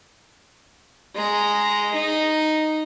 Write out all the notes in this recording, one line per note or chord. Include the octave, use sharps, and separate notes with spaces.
G#3 A#5
D#4